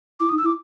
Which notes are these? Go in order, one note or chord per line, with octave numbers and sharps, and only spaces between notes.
E4 D6
D#6
D#4
E6
E4 D6